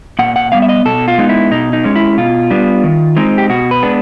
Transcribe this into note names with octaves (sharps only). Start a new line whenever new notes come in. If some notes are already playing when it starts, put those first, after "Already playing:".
A#2 F#5
F#5
G3 B3 F5
E5
D#5
B2 A4
F4
G#3 B3 D#4
E4
B2 D#4
D#4
G#3 C#4
E4
B2 F4
G3 B3 D4
D#3
G#3 C4 D#4
G4
B2 F#4
B4
G#3 B3 D4